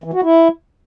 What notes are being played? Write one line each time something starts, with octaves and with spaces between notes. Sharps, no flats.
E3
F#4
E4